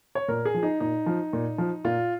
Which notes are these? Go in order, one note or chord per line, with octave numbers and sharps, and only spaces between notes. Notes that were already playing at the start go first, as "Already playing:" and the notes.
C#5
A#2 A#4
G#4
F3
D#4
A#2 D#4
F3
A#2
F3
A#2 F4